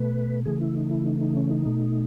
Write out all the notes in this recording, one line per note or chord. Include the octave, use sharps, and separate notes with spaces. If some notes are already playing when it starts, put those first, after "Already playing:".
Already playing: B2 A3 B4
C#3 E3 A3 G#4
E4
D#4
E4
D#4
D#4
C#4
D#4
B2 A3